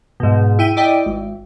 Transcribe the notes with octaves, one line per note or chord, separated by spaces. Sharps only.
G#2 B2
E4 G5 D#7
E4 D5 D#5 G5
G#1